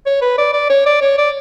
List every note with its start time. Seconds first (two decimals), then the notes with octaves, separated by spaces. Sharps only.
0.06 C#5
0.22 B4
0.38 D5
0.53 D5
0.70 C#5
0.86 D5
1.02 C#5
1.18 D5